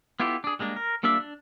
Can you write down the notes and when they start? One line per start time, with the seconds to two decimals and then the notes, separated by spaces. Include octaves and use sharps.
0.20 B3 E4 F4 G4 A4
0.44 D4 G#4
0.59 G3 G#3 A#3 D4
0.76 A#4
1.03 G3 A#3 D4 F4 E5
1.20 D4